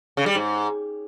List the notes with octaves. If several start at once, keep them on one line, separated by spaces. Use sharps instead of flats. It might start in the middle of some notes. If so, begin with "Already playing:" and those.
C#3
G3
G#2